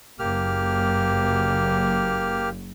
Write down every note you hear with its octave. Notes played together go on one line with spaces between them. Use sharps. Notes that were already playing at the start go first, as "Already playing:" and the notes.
F#1 A#3 G4 F6